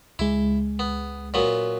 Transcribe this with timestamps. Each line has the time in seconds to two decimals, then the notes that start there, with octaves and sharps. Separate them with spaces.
0.19 C#2 G#3 E4
0.79 B3
1.34 A#2 F#3 B3